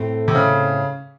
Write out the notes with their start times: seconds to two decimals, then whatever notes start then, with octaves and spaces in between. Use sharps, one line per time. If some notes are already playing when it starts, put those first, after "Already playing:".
Already playing: A2 A3 C4
0.28 C3
0.35 C#3